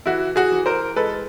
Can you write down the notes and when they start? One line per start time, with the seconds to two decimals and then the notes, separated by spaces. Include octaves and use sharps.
0.06 E3 E4 F#4
0.36 F#4 G#4
0.52 E3
0.66 A#4 C5
0.96 G#3 A4 B4